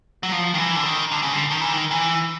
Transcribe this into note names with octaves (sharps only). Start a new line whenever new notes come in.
F#3
F3
D#3
E3
D3
D#3
D3
C#3
D3
D#3
E3
D#3
E3